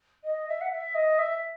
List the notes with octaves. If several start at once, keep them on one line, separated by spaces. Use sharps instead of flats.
D#5
E5
F#5
E5
D#5
E5